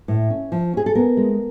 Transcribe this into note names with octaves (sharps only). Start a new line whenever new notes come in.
A2
C#4
F3
C#4 G#4
A4
B3 A#4
G#3